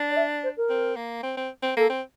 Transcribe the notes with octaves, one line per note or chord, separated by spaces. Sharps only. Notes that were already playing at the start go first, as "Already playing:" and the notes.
Already playing: D4
D5
E5
C5
A#4
C4
A#3
C4
C4
C4
A#3 A4
C4